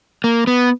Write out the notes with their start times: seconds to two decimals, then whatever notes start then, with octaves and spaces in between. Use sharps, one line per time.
0.24 A#3
0.47 B3